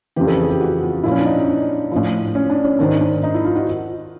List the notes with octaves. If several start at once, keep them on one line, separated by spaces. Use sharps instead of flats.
F2 C#3 E3 G4
A4
G#4
G4
F#4
F4
A#2 F3 E4
C#4
D4
D#4
D4
A2 F3
C#4
D4
C#4
G#2 D#3 D4
D4
D#4
E4
F4
F#4